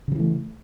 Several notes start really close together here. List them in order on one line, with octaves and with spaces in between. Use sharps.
C#3 F3 E3 A3